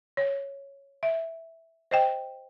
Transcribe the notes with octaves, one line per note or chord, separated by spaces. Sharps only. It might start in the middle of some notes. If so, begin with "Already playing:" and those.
C#5
E5
C5 D#5 G5